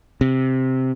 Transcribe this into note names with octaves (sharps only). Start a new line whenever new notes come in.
C3